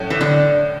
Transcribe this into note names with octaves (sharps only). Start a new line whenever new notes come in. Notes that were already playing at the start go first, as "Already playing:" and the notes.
Already playing: A2 F#3 C#4
E3
D3